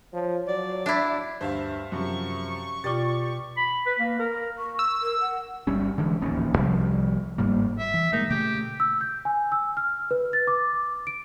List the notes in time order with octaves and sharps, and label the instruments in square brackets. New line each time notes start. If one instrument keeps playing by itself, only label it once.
[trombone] F3 [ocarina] C#5
[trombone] F#3 [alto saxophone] D5
[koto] D4 E4 [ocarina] E5
[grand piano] D2 G2 [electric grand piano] C5 E5 F5
[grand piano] F#2 C3 F3 [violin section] C#6
[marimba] B2 F4 [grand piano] G4 D5 D6 [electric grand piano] A6
[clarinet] B5
B4
A#3
A#4
[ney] C#6
[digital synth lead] E6
[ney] A#4
F#5
[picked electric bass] G1 G3 C#4
D3 E3 G#3
D1 A#1 D#2 C#4
C2 C3 F3 G3
G1 G#2 G3 A#3
[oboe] E5
[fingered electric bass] E3
[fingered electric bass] A#2 G#3 A#3 [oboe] D#4
[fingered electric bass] A#2 C#3 A3 [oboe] G4
[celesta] E6
G6
G#5
E6
F6
B4
A6
D6
D7